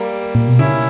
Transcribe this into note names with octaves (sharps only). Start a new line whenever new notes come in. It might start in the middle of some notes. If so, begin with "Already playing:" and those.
Already playing: G3 A#3
A#2
B2
C#3 C#4 E4